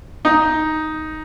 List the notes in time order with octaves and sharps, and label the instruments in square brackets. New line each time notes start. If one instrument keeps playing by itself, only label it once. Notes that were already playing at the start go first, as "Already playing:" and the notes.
[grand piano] D#4